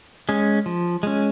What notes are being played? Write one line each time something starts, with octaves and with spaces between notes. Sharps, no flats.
G#3 C#4
F3
G#3 C#4